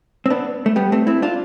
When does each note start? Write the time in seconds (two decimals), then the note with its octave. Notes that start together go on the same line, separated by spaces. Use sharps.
0.26 C4
0.30 B3 D4
0.66 A3
0.76 G3 B3
0.92 A3 C4
1.07 C4 E4
1.22 D4 F4